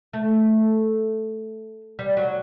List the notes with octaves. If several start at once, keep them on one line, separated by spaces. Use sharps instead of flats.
A3
G3
F#3